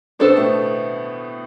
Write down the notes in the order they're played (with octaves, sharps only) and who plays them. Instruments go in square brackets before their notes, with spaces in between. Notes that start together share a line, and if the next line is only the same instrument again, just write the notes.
[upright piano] B2 B3 [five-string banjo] D4 A4 C5
[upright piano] A2 A3